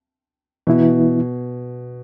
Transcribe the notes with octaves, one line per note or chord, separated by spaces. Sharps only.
B2 E3 B3 E4